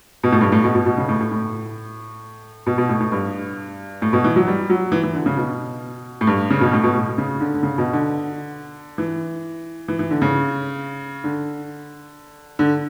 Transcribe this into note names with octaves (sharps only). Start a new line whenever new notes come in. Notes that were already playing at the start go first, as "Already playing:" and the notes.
B2
A2
G2
A2
B2
B2
B2
C#3
A2
A2
A2
B2
B2
A2
A2
G2
A2
B2
E3
F#3
G3
F#3
E3
E3
D3
C#3
B2
A2
G2
C#3
B2
A2
B2
A2
C#3
D3
D3
C#3
B2
D3
E3
E3
E3
D3
C#3
D3
D3